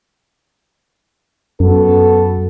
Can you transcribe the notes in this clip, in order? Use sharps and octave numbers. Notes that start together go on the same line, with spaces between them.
F#2 B3 F#4 A4